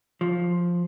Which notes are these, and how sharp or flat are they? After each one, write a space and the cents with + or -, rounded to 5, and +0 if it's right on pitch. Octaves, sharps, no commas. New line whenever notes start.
F3 +5